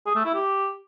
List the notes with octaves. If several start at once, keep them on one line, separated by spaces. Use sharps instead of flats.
G#4
A3
E4
G4